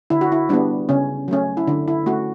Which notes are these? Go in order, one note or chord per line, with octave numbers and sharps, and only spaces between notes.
D3 E4
F#4
E4
G3 B3 D4
C#3 C#4
F#3 A3 C#4
E4
D3 D4
E4
A3 C#4 F#4